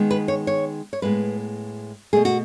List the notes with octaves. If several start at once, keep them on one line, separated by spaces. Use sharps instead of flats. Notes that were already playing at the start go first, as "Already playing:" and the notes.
Already playing: D#3 G#3 B3
B4
C#5
C#5
C#5
A2 G#3 B3 B4
B2 A3 G#4
F#4